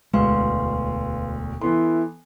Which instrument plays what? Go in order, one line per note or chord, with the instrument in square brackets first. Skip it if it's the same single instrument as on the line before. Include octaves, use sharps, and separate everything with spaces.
[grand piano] E1 D2 [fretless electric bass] G#3 [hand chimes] B4 F5 C6
[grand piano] E3 B3 C6 [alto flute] E4 [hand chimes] A4